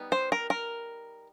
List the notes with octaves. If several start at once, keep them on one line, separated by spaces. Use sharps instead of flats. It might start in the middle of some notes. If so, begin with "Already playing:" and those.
Already playing: G3 B3 D#4
C5
A#4
A#4